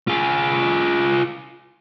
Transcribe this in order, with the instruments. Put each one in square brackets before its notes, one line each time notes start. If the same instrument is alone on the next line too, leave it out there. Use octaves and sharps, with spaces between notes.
[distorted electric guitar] F4 G#4